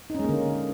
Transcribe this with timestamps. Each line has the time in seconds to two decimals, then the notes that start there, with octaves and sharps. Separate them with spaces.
0.10 D#4
0.15 C#4
0.19 G#3
0.24 A#3
0.29 D3